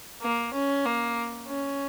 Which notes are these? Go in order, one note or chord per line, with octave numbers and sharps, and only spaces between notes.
A#3
C#4
A#3
C#4